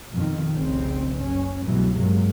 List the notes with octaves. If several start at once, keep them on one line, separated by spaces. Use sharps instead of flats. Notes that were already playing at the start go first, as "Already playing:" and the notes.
F2 B2 D#3
F1 C2 C#3 C4
F#1 C#4
C2 G2 B2 E3 F#3 A3
A1 G2 C3 F#3 G#3 A#3